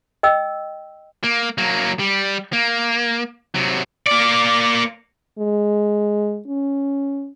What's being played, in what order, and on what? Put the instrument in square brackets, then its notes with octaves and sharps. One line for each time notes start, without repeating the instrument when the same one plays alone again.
[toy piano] D#5 G5 E6
[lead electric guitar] A#3
F#3 A#3
G3
A#3
C3 F#3
[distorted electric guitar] A#3 D5
[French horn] G#3
C#4